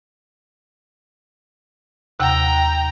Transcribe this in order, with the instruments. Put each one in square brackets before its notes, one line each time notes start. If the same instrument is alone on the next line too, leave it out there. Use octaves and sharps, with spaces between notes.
[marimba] D#2 C3 F#5 [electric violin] G5 A#5